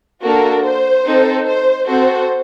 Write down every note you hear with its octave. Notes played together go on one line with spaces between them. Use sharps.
A#3 D4 F#4 A4 A#4
C5
C4 D#4 A4
C5
C4 F#4 A4 C5